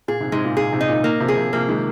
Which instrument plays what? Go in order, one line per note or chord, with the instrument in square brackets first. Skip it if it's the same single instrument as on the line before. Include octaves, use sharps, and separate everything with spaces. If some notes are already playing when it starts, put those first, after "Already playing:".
[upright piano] A#2 [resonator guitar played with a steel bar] G#4
[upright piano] G#2 C3
[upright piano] G#2 C3 [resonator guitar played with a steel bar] G#3
[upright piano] A#2
[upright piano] A#2 [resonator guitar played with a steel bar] G#4
[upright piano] G#2 C3
[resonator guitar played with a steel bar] D#4
[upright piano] A#2 D#3
[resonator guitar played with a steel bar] A#3
[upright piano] C3 F3
[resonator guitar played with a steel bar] G#4
[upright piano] C3 F3
[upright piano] C3 F3 [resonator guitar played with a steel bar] A#3
[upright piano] D#3 G#3